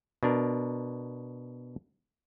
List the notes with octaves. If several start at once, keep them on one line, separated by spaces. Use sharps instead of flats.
B2 D4 A#4